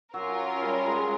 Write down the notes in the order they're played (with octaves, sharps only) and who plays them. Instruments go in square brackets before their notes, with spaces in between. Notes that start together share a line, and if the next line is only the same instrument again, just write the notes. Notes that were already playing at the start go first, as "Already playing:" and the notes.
[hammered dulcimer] F#3 [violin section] C#4 F4 A#4
[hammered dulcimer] G3
G#3